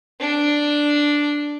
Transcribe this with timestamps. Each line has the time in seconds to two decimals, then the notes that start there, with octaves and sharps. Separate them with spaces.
0.20 D4